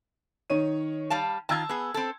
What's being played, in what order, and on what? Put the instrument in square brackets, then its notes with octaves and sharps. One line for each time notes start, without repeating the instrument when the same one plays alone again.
[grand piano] D#3 C#5 D#7
[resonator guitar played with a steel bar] G3 F5 A5
[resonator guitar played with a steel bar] D#3 F4 [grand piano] A5 E6 G#6
[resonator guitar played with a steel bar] B3 G#4
C4 A4